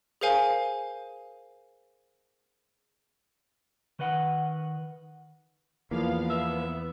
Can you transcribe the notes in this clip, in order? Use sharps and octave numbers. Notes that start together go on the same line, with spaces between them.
G#4 A#4 C5 F5 G#5
D#3 B4 D#5 F#5
E2 F3 A#3 B3 F5
B3 E5